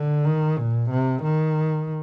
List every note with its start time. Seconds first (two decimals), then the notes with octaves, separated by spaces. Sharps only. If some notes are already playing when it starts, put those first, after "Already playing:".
Already playing: D3
0.25 D#3
0.59 A#2
0.91 C3
1.24 D#3